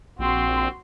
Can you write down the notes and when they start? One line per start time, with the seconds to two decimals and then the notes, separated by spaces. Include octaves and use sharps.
0.19 A#1 C4 F#4 C6